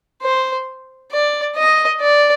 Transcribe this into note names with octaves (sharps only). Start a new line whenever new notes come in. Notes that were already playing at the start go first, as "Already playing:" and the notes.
C5
D5
D#5
D5